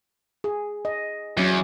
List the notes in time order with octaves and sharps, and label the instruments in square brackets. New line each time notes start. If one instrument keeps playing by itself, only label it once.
[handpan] G#4
D#5
[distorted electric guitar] E2 [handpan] F#3 C#4